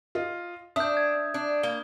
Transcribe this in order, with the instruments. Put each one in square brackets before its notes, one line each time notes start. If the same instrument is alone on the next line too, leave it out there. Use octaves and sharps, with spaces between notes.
[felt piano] F4 D#5
[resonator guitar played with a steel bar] D4 [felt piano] E5 [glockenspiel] D#6 G6
[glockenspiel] G#6
[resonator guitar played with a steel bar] D4
[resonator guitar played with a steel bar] A#3 [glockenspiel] G7